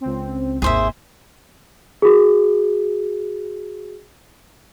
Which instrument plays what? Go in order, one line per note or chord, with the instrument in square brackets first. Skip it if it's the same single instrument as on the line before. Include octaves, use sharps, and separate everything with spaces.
[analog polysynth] C#2 C4
[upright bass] G#1 D#2 [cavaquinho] G#4 C5 E5
[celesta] F#4 G#4